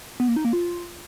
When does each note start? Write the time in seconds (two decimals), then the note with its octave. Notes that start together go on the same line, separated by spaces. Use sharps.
0.20 B3
0.28 A#3
0.36 D#4
0.45 A#3
0.53 F4